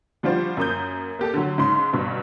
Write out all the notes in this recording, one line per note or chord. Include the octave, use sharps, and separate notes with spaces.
F3 G3 D4 F4 F#4 C5
F#2 A#3 D#6 G6
A#3 G4 A4
D3 F#3
G#2 C#3 C6
G1 G2 B2